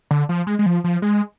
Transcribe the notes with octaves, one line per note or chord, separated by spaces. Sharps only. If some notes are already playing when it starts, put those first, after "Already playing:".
D3
F3
G#3
G#3
F3
F3
G#3